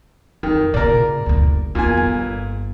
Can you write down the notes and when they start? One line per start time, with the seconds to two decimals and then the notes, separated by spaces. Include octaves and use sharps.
0.43 F2 D#3
0.74 A#2 C#3 A#4 D5
1.26 F#1 D2
1.75 E2 A#2 G#5
1.97 G1